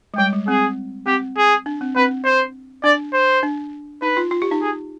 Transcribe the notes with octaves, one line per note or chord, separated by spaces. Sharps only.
G#3
G3 G5
G#3
C4 G#4
C4 G4
G#4
D4
C4
C4 B4
C5
D4 D5
C5
D4
D#4 B4
F4
F4
G4
D#4
G#4